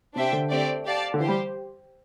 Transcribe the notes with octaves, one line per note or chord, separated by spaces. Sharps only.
C3 D4 G4 C5 E5 G5
D3
A3 C4 G4 D5 G5
G4 D5 F5 A5
D3
E3 G4 C5
G3